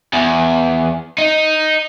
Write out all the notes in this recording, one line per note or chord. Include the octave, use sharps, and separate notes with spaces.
E2
D#4